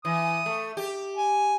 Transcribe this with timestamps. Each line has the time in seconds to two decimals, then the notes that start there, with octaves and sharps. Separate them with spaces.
0.05 E3 D#6
0.46 A3
0.77 G4
1.17 G#5